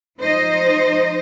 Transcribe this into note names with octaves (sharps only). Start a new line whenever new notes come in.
F3 D#4 C5 D#5